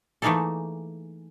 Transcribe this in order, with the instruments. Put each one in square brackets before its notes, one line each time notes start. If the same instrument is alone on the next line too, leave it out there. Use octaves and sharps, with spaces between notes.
[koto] E3 A3 A#3 D#4 G#4 A4